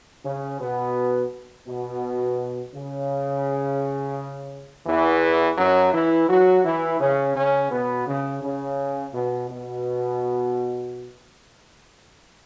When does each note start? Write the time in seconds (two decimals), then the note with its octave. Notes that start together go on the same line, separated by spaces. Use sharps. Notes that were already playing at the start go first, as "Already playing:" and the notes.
0.25 C#3 C#4
0.60 B2 B3
1.67 B2
2.73 C#3
4.86 E2 E3
5.58 F#2 F#3
5.93 E3 E4
6.29 F#3 F#4
6.65 E3 E4
7.00 C#3 C#4
7.36 C#3 C#4
7.71 B2 B3
8.07 C#3
8.42 C#3
9.13 B2
9.49 B2